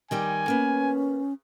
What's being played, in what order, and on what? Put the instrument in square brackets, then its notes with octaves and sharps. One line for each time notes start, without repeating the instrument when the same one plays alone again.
[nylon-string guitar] D#3 G3 G4 [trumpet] G#5
[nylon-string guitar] A#3 B3 [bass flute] C#4